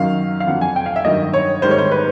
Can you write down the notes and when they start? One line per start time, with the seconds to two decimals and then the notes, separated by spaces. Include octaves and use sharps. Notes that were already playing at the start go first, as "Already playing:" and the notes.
Already playing: F#2 D#3 F#3 F5
0.40 F5
0.47 F2 D3 F#3 F#5
0.61 G#5
0.76 G5
0.86 F5
0.96 E5
1.05 G2 D#3 F#3 D#5
1.34 C#5
1.62 G#2 D#3 G3 C5
1.71 C#5
1.78 C5
1.91 B4